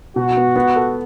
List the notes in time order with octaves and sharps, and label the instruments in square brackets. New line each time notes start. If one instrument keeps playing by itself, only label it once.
[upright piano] B2 [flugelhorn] F#4
[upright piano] B3
B3
A4